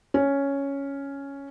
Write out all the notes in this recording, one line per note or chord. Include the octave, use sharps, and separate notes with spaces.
C#4